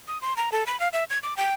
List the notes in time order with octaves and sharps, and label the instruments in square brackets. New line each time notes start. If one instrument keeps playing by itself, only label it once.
[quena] D#6
C6
A#5
A4
B5
F5
E5
G#6
D6
G5